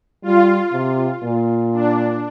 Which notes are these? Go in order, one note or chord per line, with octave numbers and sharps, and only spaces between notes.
G3 F4
C3
A#2
D4